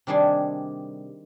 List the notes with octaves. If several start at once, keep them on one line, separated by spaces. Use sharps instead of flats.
C3 D#3 G3 D4 G#4